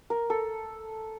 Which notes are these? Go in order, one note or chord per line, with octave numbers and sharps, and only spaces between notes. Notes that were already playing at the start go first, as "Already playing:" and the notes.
A#4
A4